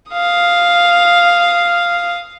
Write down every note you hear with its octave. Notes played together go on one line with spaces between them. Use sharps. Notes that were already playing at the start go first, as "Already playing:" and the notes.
F5 D#6